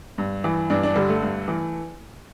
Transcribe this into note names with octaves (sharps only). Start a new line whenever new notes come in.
G2
E3
G2 D4
D4
D3 G3
A3
G2
E3